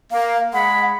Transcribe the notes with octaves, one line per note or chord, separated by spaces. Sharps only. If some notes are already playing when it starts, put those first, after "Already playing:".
A#3 F5
G#3 F#5 B5